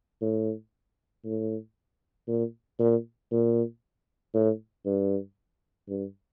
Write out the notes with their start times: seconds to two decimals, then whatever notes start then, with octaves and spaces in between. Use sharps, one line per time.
0.21 A2
1.25 A2
2.28 A#2
2.79 A#2
3.31 A#2
4.34 A2
4.86 G2
5.89 G2